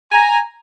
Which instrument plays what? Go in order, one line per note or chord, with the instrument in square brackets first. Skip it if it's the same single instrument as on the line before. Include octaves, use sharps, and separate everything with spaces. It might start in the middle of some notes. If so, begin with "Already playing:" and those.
[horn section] G#5 A#5